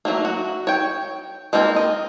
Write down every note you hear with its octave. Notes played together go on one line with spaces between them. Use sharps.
F#3 A3 A#3
F#4
C#5 G5
G#3 A#3 C4 F4
D#5